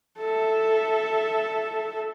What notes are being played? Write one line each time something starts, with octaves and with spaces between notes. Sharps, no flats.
A4 E5